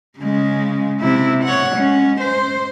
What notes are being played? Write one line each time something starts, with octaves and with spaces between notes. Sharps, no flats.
C#3 G#3
C3 E4
C#5 F#5
G#3 C#4
C5